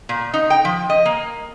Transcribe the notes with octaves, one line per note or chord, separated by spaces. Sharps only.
A#2
D#4
G5
F3
D#5
A#3